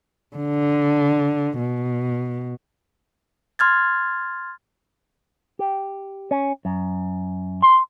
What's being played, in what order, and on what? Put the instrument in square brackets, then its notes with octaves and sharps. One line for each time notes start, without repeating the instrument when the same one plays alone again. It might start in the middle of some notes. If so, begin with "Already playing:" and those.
[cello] D3
B2
[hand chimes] C6 F6 G#6 A6
[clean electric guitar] G4
C#4
F#2
C6